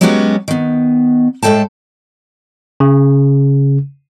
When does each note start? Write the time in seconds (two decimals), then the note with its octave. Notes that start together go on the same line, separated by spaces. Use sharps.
0.01 F#3 G#3 B3 C#4 F#4 G4
0.48 D#3 B3
1.43 A2 G#3 A3 A4 G5 A5
2.80 C#3